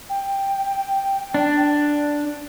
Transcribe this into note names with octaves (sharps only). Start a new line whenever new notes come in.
G5
D4